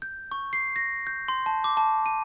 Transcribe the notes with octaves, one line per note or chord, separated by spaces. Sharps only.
G6
C#6
C7
A#6
G6
C6
A5
D6
A5
D#7